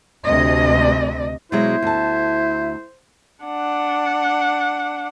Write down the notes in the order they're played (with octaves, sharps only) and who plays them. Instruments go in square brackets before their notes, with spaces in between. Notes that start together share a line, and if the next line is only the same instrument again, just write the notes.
[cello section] D2 C3 D#5
[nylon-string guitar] B2 F#3 G#3 [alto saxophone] E4 [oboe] C5
[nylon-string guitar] D2 A5
[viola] D4 F#5